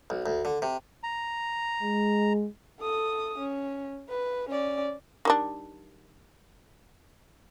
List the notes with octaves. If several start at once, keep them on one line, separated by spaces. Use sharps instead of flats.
B1
D2
D3
C3
A#5
G#3
A4 D#6
C#4
B4
C#4 D5
D#3 G3 D4